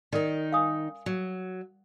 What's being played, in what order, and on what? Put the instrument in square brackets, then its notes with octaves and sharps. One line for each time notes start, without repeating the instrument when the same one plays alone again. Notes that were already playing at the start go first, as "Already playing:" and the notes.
[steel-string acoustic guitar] D#3 D#4 [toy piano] A#4 D5
[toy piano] F5 G#5 D#6
[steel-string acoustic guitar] F#3